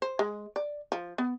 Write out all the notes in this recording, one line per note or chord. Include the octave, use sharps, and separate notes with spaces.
C5
G#3
D5
F3
B3